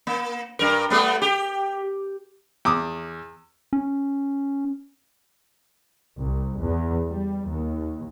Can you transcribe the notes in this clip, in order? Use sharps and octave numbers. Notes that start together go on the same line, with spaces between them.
A#3
G2 A#4
G3 A3 B3
G4
E2 D6 D#6
C#4
C2
E2
G3
D#2